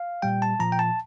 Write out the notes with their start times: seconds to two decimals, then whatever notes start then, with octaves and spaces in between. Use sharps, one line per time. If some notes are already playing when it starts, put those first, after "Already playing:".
Already playing: F5
0.22 A#2 G3 G5
0.42 A5
0.60 A#2 F3 A#5
0.72 G5
0.79 A5